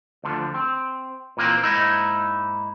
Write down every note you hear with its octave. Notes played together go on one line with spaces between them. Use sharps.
D2 D3 E3 F3
C4
A#2 E3 A#3 C4
G#2 A#3 D#4 E4